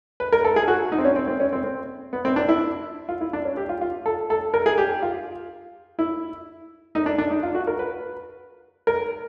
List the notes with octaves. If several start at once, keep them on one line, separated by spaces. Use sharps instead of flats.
B4
A#4
A4
G#4
F#4
D#4
C4
C#4
C4
C4
C#4
C4
C4
B3
C4
D4
E4
F4
E4
D4
C#4
G4
F4
F4
A4
A4
A#4
G#4
G4
F4
E4
D#4
D4
D4
D#4
F4
F#4
A#4
B4
A#4